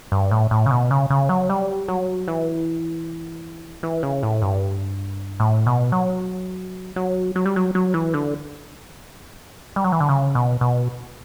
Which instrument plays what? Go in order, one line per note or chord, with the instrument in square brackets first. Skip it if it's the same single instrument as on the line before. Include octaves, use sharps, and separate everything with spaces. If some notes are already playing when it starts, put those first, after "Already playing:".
[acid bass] G2
A2
A2
C#3
B2
C#3
C#3
F#3
G3
F#3
E3
E3
C#3
A2
G2
A2
B2
F#3
F#3
F#3
G3
F#3
F#3
E3
D3
G3
F#3
E3
D3
C#3
B2
B2